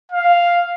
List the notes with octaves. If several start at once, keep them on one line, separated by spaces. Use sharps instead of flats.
F5